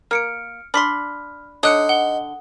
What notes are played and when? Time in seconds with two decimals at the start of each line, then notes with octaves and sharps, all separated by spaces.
0.11 A#3 F6 C#7 D7
0.74 D4 B5 C6 F6 B6
1.63 D3 D#4 C#5 D#6 F#6 C#7
1.89 F#5 G7